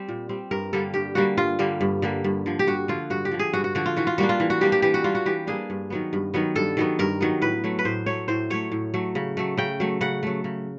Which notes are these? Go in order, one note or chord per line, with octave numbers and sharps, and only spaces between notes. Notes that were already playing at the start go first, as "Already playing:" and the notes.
Already playing: G3 C4
A#2
G3 C4
G2 A#4
D3 G3 A#3 A4
G2 G4
D3 G3 A#3 F#4
G2 F4
D3 G3 A#3
G2
D3 G3 A#3
G2
D3 F3
G4
G2 F#4
D3 F3 F4
G2 F#4
G4
D3 F3
G#4
G2 F#4
F#4
D3 F3 F#4
F4
E3 F#4
F4
G3 A#3 D4 F#4
F4
E3
F#4
G3 A#3 D4 G4
G4
E3 G4
F#4
G3 A#3 D4 F4
F#4
E3 G4
G3 A#3 D4 G#4
G2
D#3 F#3 B3
G2
D#3 F#3 B3
G2 A4
D#3 F#3 B3
G2 A#4
D#3 F#3 B3
A2 B4
F#3 A3
B4
A2 C5
F#3 A3 C#5
A2 C5
F#3 A3 C#5
A2
F#3 A3
C#3
F#3 A3
C#3 G5
F#3 A3
C#3 F#5
F#3 A3
C#3